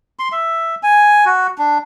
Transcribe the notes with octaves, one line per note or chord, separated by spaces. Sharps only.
C6
E5
G#5
F#4
D4